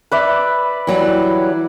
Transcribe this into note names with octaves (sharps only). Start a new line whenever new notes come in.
B4 D5 E5
E3 F#3 G3